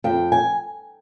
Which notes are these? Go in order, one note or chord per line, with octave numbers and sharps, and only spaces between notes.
F2 G5
G#5